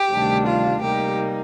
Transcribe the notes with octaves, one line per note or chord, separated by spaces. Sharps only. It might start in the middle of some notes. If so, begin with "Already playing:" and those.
Already playing: G4
D2 C3 D#3 G3 D4
F4
C3 G3 A#3 D#4 G4